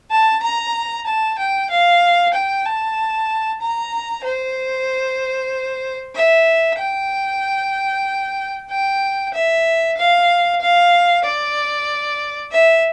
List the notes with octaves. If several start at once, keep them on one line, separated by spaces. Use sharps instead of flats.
A5
A#5
A5
G5
F5
G5
A5
A#5
C5
E5
G5
G5
E5
F5
F5
D5
E5